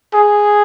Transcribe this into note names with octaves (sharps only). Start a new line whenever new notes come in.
G#4